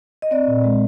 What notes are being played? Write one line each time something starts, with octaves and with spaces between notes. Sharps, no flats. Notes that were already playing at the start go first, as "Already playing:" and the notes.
D#5
C4 D5
A#2
G#3